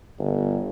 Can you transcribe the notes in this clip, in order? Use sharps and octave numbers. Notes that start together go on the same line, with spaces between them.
G1